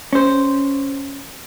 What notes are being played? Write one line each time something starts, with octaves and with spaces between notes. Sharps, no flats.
C#4 C5